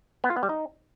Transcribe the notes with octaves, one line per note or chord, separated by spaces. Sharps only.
B3
F4
B3
G3
D#4